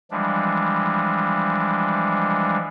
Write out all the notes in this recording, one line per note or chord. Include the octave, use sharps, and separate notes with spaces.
E3 F3 G3 G#3 D4